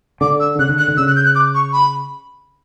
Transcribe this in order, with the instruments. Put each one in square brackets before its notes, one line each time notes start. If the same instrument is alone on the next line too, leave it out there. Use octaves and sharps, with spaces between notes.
[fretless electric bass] D3 [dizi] D6
[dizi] E6
[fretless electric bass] C#3 [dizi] F#6
[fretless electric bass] D3
[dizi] F#6
[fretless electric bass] D3
[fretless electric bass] C#3 [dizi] E6
[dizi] F#6
G6
F#6
D6
C#6
B5